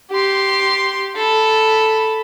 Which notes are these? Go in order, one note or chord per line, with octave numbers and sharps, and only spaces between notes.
G4 C6
A4 B5